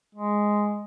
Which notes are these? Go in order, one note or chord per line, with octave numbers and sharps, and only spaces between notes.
G#3